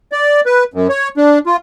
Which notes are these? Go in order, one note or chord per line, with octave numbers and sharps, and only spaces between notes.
D5
B4
F#2
C#5
D4
F4